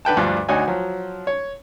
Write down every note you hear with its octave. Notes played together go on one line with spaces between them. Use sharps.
D3 B4 G5 A5
D2 G2 F3 D4
D2 D4 D#4 F#4 C#5 G#5
F3 F#3
C#5